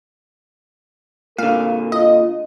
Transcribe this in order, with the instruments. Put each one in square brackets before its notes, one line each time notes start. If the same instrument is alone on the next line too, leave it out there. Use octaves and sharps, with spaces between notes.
[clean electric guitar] A#2 D3 [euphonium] A#4 [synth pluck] F5
[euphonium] F4 [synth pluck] D#5